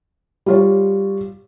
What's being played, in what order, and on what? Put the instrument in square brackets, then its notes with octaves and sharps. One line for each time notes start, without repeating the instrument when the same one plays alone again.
[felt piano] G3 F4 C#5